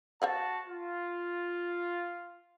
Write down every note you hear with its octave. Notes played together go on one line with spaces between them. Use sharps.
F#4 C5 F5 F#5 A5
F4